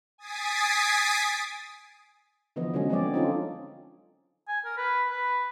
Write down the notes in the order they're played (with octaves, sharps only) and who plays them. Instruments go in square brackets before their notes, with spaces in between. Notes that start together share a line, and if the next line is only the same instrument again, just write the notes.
[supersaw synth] G#5 D#6 A6 B6 C7 D7
[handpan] D3 E3 F3 B3 D#5
D3 F#3 G#3 C#4
F3 G#3 C4 G#4 D5
C#4 D#4 F4 A4
[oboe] G#5
A#4
B4
B4